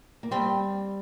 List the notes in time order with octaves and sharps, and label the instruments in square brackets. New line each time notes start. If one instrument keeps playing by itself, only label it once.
[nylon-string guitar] A#3
[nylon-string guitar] G3 [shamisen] C4